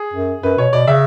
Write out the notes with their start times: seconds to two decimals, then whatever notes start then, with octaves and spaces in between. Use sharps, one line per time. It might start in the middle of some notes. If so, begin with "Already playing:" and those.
Already playing: G#4
0.14 F#2
0.43 F#2 B4
0.57 B2 C#5
0.73 B2 D5
0.87 C#3 E5